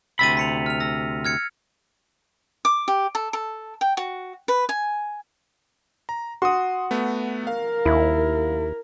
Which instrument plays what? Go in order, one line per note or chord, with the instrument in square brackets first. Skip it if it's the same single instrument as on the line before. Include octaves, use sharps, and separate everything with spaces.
[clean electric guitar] D2 C3 B5 [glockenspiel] E6 A6 D#7
[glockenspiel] B6 C#7 F7
F6 F7
E6 A#6
F6 G#6 C#7
[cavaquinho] D6
G4
A4
A4
G5
F#4
B4
G#5
[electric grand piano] A#5
[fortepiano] F#4 [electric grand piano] C6 D#6
[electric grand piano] A3 B3
[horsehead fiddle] A#4 [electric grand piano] F5
[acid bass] D#2 [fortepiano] E4